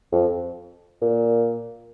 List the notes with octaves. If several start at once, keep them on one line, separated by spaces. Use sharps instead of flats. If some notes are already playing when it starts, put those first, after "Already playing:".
F2
A#2